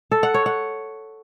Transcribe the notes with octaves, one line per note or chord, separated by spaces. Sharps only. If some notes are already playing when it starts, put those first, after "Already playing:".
A4
F#5
C#5
F#5